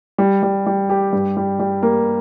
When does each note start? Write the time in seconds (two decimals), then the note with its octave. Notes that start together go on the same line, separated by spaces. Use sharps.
0.18 G3
0.43 G3
0.66 G3
0.89 G4
1.13 G2
1.37 G3
1.59 G3
1.83 A#3